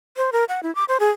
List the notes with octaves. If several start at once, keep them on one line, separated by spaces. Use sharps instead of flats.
C5
A#4
F#5
E4
D6
C5
G#4